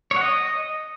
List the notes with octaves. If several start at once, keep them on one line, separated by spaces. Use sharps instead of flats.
C#5
F#5
D#5